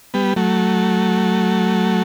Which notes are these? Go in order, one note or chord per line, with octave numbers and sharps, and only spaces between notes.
G3 B3
F#3 A3